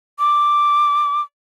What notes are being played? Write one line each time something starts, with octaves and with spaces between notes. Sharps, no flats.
D6